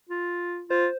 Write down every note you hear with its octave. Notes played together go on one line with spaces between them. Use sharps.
F4
F4 C5